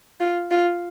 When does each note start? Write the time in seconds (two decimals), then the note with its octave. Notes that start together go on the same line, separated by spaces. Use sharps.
0.20 F4
0.51 F4